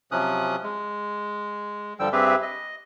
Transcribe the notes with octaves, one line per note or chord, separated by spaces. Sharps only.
C3 F3 F#3 C#4 D#6 F#6
G#3
G2 D3 F3 G3 G5 E6
G2 C4 G4 G#4 B4 E5
D#5